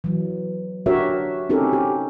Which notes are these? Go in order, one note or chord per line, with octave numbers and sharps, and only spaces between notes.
E3 F#3
D4 F#4 G4 A#4 C#5 E5
C4 C#4 D#4 G4 A4 A#4
G4